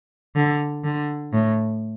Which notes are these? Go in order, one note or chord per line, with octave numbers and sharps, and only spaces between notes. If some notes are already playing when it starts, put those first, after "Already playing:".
D3
D3
A2